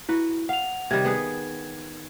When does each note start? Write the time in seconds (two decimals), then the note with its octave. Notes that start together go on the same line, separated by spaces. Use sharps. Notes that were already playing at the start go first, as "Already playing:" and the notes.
0.09 E4 F#4 B4
0.49 F5 F#5 F7
0.91 C3 D#3 G3 G#6
1.05 B3 G#4 B4